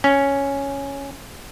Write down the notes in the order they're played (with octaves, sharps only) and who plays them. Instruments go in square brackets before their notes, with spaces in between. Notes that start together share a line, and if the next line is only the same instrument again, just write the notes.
[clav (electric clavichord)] C#4